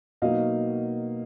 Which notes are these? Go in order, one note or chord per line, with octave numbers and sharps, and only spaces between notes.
B2 F#3 A#3 D#4 D#5 F5